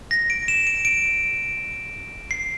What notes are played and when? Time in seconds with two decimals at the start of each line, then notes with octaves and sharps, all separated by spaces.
0.11 A#6
0.30 D7
0.48 E7
0.67 D7
0.85 D7
2.31 C7